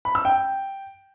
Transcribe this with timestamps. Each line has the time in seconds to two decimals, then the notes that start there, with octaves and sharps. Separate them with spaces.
0.05 B5
0.15 E6
0.25 G5